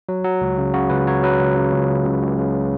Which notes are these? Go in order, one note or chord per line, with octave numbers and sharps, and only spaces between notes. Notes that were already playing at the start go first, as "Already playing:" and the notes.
F#3
F#3
C#2
C#3
C#3 F#4
C#2 B4
F#3 C#5
F#3 B4
C#2
C#3
C#2
C#2
C#2
C#2
C#3